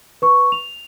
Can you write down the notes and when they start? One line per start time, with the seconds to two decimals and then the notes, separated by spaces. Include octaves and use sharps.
0.22 B4 C#6
0.52 F7